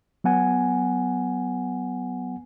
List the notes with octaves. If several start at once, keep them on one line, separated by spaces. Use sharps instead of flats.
F#3 B3 F#5 G#5